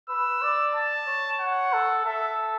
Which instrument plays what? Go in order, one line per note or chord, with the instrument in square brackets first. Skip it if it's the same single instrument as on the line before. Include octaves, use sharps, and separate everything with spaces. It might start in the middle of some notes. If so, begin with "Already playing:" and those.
[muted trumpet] B4 [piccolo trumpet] E6
[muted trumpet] D5
[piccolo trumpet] A5
[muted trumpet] C#5
[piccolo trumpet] F#5
[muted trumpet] A4
[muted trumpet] A4 [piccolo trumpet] E5